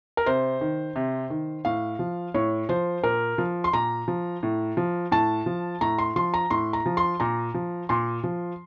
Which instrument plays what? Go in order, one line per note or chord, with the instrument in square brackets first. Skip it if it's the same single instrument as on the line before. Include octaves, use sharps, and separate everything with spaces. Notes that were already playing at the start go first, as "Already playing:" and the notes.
[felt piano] A#4
C3 C5
D#3
C3
D#3
A2 F5
F3
A2 C#5
F3 C5
A#2 A#4
F3
C6
A#2 A#5
F3
A2
F3
A2 A5
F3
A2 A#5
C6
F3 C6
A#5
A2 C6
A#5
F3
C6
A#2 A#5
F3
A#2 C6
F3